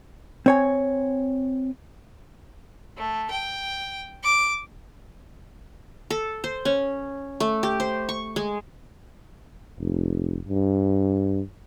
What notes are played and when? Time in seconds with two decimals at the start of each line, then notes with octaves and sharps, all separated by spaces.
0.46 C4 C#5 G#5
2.97 A3
3.30 G5
4.23 D6
6.10 A4
6.44 C5
6.65 C#4
7.40 A3
7.63 G4
7.80 C5
8.09 C#6
8.36 G#3
9.78 F1
10.48 G2